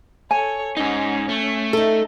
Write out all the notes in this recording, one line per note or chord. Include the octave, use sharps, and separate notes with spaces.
A4 C#5 G#5
G#2 C#4 D#4
A3
D#4 A4